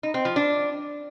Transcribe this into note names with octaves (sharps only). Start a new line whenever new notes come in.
D#4
C4
F3
D4